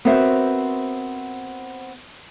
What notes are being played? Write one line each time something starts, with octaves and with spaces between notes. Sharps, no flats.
B3 C4 F#4 A#4 C5 E5